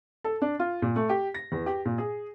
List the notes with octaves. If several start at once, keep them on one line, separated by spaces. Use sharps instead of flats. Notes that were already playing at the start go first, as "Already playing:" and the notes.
A4
D4
F4
A#2
A3
G4
A#6
E2
G4
A#2
G#4